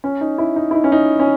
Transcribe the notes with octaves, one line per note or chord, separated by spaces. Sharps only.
C#4
D#4
E4
D#4
E4
D#4
C#4
D#4
C#4